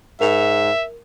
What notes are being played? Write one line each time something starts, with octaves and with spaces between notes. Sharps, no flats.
G#2 A#4 E5 F7